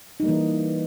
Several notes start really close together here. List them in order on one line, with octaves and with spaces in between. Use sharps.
D#4 G3 A#3 E3